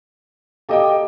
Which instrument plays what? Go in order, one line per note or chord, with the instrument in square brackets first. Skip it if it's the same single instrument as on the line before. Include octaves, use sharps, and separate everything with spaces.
[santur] A#3 G4 E6 [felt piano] A4 D#5 G5